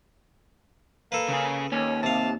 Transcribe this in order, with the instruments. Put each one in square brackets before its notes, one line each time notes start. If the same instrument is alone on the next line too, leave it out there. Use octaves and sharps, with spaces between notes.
[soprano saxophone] A#3 [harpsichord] A4 B4
[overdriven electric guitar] C#3 G#4
[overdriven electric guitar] D#2 [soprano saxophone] C#4
[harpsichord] C3 F5 [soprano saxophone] A5